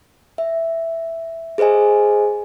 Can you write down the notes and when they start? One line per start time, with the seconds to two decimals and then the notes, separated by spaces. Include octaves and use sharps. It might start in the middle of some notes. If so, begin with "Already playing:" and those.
0.38 E5
1.58 G#4 B4 C5 D#5 G#5